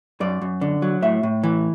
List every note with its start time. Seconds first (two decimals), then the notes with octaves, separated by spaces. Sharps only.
0.20 F#2 D5
0.41 F#2
0.61 D3
0.82 F#3
1.02 A2 E5
1.23 A2
1.43 E3